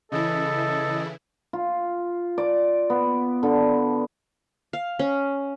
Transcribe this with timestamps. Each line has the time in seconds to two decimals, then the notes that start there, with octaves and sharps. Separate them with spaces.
0.12 C#3 E3 E4 A4 D#5
1.53 F4
2.38 D5
2.90 B3
3.43 D3
4.73 F5
4.99 C#4